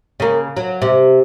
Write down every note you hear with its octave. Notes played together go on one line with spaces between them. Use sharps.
C#3 A#3
F#3
C3